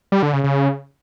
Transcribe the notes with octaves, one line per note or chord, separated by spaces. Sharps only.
G3
D3
C#3
C#3